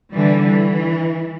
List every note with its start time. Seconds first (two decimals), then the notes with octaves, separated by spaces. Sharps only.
0.12 D3 E3 G3
0.46 E3